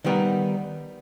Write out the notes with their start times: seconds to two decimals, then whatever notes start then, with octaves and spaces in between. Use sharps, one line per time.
0.04 D#3 G3 B3 D#4